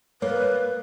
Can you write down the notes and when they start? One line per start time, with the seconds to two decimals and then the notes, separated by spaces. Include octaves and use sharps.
0.22 A#3 B4 C#5